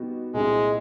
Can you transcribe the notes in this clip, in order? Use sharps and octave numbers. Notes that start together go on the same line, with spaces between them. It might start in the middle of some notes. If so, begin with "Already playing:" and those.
Already playing: B2 G3 B3 D#4 F#4
C2 A#2 G3 G#3 C4 E4